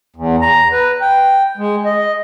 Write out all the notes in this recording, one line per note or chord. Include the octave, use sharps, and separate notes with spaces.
E2
A#5
B4
G5
G#3
D#5